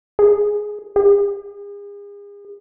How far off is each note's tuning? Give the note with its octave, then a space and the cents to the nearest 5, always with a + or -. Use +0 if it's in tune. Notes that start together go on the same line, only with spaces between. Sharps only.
G#4 +5
G#4 -40